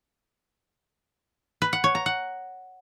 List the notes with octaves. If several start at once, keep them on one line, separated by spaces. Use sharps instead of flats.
B4
F#5
C#5
A#5
F#5